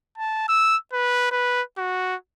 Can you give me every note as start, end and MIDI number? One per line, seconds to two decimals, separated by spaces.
0.18 0.45 81
0.48 0.77 88
0.93 1.30 71
1.31 1.62 71
1.78 2.16 66